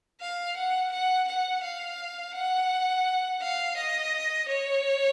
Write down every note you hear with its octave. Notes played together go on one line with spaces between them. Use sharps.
F5
F#5
F#5
F#5
F5
F#5
F5
D#5
C#5